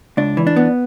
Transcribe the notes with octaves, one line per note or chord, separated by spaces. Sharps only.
C#2 D4
E3
D4
B3